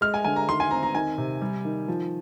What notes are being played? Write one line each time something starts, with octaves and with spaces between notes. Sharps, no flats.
G#3 F6
G#5
D3 G#5
A#5
D#3 C6
G#5
C4 A#5
A#5
D#3 G#5
C3
G3
D#3
F3